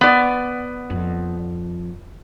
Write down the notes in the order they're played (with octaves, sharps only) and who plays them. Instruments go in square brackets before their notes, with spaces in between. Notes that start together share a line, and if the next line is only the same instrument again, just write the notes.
[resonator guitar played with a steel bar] B3 D5
[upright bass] F2